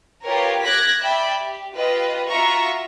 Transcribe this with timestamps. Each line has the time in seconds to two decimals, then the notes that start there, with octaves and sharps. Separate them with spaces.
0.24 F4 G4 A#4 B4 C#5
0.62 D6 F#6 G#6 A#6 B6
1.01 D5 E5 G5 B5
1.40 G4
1.75 F4 G4 B4 D#5
2.28 F4 F#4 E5 A#5 C#6